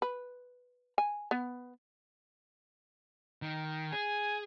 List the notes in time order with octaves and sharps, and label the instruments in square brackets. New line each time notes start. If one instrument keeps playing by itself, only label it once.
[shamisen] B4
G#5
B3
[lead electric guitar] D#3
[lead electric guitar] G#4 [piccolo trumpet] G#5